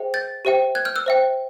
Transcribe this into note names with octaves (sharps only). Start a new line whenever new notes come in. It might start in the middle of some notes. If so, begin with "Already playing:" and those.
Already playing: G#4 C5 E5 G5
G6 A6
G4 C5 E5 G5
F#6 G#6
F6 G6
E6 F#6
C5 E5 G5